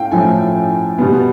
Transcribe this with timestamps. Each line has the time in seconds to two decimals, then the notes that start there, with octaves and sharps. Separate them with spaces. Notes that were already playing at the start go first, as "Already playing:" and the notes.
Already playing: A2 A3 C#4 F5 G5
0.11 A2 F3 A3 C#4 G#5
0.98 B2 G3 B3